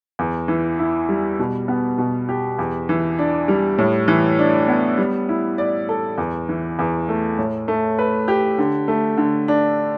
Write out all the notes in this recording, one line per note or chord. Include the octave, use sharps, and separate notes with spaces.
E2
E3
E4
G3
B2
B3
B2
G4
E2
E3
D4
G3
A2
E3
D4
B3
G3
E4
D5
A4
E2
E3
E2
A3
A2
A3
B4
G4
D3
A3
D3
D4